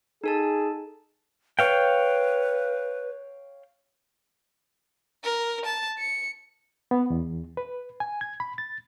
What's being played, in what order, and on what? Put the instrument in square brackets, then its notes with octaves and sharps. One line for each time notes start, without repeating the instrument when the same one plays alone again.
[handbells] D#4 A4 A5 [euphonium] G#4
[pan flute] B4 [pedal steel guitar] C#5 F5 G5
[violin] A#4
A5
C#7
[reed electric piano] B3
E2
B4
G#5
G#6
B5
A6